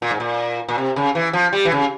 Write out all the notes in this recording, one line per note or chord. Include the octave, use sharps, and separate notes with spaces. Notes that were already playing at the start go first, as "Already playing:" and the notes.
A#2
G#2
A#2
A#2
C3
C#3
E3
F3
G3
E3
C#3